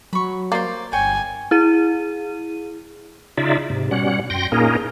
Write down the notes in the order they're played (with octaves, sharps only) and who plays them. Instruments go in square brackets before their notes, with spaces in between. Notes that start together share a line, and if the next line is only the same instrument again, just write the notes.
[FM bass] F#3 [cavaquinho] B5 C#6
[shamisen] A#3 [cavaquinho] C5 D5
[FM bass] G1 [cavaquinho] C#5 G5 [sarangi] G#5
[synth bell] E4 G#4 D#7
[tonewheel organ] C#3 D#4 F4 D5 E5
G#2 C3
B2 G3 C#4 F#5
F#2 G5 C6 A#6
A#2 A#3 C#4 D#4 G#4 A#4